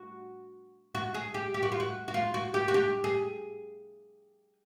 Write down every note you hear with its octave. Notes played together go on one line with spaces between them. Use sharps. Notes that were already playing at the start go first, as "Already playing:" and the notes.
Already playing: F#4
F#4
G#4
G4
G4
F#4
F4
F#4
F#4
F4
F#4
G4
F#4
G4
G#4